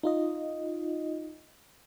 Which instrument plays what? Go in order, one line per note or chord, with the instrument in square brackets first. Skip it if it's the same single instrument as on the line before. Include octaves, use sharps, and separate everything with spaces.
[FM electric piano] D#4 F4 D#5